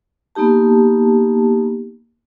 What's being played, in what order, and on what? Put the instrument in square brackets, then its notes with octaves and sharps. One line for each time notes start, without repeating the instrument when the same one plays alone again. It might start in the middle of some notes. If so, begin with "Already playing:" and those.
[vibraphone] A#3 B3 D#4 G4 A5